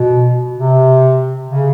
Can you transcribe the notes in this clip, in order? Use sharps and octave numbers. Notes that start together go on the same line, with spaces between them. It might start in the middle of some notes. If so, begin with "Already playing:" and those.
Already playing: B2
C3
C#3